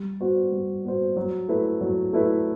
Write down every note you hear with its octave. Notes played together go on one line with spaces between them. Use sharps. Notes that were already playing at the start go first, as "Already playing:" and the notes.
Already playing: G3
B3 F#4 C5
G3
B3 F#4 C5
F#3
A3 E4 B4
F#3
A3 E4 B4